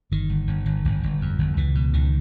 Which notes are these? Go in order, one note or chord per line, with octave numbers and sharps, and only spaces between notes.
G1 D#3
G1
G1
G1
G1
G1
F2
G1
C#2 E3
B2
C#2 D#3